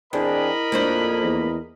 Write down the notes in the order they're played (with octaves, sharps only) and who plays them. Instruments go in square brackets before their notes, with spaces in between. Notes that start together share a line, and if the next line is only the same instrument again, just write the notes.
[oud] E2 [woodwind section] C4 D4 G#4 [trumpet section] A#4 D#5 B5
[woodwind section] F2 [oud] A#3 D4 C5
[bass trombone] E2